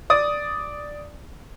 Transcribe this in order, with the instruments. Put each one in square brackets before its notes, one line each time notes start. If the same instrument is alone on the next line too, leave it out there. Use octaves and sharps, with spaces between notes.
[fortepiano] D5 D#6